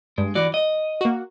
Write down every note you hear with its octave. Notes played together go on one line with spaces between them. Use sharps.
G2 G#3
E3 F#4 D5
D#5
A#3 F#4